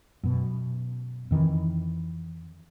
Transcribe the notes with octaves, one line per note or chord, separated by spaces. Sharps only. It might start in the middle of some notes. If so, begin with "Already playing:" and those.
F#2 B2
F2 D#3 E3